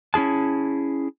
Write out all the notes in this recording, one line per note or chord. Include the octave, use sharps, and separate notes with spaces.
C#4 E4 G#4 A5